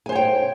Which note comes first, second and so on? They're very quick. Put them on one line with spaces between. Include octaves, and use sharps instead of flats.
G#5 C5 C#5 G5